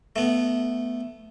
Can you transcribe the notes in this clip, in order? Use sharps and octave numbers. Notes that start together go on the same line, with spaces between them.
A3 B3